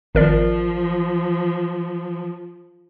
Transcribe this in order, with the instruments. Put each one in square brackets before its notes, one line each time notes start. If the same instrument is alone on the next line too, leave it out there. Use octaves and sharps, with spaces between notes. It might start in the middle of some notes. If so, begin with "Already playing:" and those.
[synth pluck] G#1 A#4 D5 [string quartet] F3